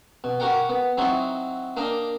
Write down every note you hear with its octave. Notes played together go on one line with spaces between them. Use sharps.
B2
F#4 G4 A#4 F#5 G5
B3
F#3 C4 D#4 E4 F#4
A#3 D4 A#4 D#5 G5